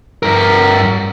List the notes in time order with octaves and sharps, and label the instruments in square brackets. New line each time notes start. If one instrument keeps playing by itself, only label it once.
[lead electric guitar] G2 A#4